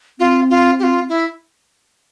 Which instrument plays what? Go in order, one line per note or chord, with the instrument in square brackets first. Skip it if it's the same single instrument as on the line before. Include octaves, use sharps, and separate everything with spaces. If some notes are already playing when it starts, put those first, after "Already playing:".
[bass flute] C4 [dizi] F4
[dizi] F4
G4
F4
E4